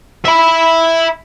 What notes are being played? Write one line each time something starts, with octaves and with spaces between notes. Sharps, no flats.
E5 B5